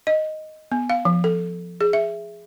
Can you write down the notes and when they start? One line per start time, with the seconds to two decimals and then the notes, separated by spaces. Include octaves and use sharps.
0.07 D#5
0.72 B3
0.90 F5
1.05 F3
1.24 A4
1.81 G#4
1.93 E5